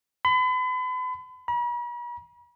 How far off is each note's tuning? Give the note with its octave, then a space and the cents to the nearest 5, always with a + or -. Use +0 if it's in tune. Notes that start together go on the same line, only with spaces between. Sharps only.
B5 +40
B5 -45